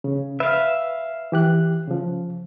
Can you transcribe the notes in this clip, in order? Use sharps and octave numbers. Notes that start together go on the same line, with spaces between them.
C#3
B4 E5 F5
E3 G4 F#6
C#3 F3